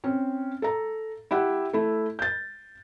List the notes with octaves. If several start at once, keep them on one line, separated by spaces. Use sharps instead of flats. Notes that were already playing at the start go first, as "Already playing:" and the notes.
C4 C#4
A4 A#5
E4 G4 E5 F#5
A3 E4
G6 A6